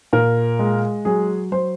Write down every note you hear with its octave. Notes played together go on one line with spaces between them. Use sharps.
A#2 A#4
G#3
F#3 G#4
F#3 C5